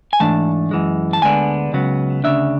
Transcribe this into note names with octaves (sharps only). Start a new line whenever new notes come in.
G#5
G#2 E3 A3 D4 A5
F#2 E3 G#3
A5
D2 D3 G#3 B3 D4 G#5
C#2 C#3 F#3 B3
D2 C#3 G#3 D4 E5